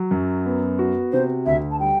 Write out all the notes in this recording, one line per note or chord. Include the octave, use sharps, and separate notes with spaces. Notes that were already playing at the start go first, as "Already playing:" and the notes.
Already playing: F#3
F#2
B3
F#4
C3 C5
D2 E5
A5
G3 G5